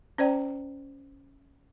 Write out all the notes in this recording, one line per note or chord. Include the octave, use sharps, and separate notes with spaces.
C#4 C5 D5 G5 A#5